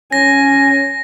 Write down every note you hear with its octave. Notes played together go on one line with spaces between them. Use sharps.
C#4 G#5 A#6